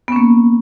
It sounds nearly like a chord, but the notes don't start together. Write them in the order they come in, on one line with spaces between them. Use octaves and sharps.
B3 C#4 A#3